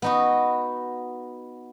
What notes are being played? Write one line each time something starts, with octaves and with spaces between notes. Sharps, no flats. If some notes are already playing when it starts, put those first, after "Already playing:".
B3 D#4 F#4